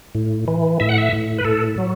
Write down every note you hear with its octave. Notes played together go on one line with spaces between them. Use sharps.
A2
E3
A2 E5
F#5
E5
A2
B4
A2 A4
F#3